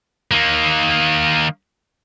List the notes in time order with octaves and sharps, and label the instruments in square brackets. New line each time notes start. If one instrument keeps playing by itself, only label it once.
[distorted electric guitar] D#3 A#3